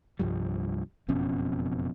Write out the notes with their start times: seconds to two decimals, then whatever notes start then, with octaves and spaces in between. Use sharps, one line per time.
0.19 C2 G2 F3 G3
1.08 F#1 F2 B2 C#4